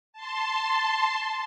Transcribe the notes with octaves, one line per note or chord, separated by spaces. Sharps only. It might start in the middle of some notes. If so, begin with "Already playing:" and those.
A5 C6